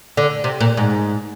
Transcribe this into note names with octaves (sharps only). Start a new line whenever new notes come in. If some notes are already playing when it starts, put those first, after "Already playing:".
D3
C3
A#2
G#2